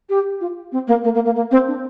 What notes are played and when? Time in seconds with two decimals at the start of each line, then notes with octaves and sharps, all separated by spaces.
0.09 G4
0.41 F4
0.72 C4
0.87 A#3
1.04 A#3
1.15 A#3
1.25 A#3
1.36 A#3
1.51 C4
1.67 D4